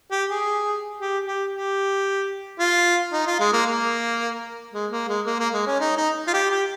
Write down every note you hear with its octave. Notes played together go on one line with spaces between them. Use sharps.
G4
G#4
G4
G4
G4
F4
D#4
F4
G#3
A#3
A#3
G#3
A#3
G#3
A#3
A#3
G#3
C#4
D#4
D#4
F4
G4
G4